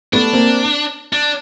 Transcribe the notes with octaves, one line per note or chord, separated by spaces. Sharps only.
A3 B3 D4
A#3 C4
D4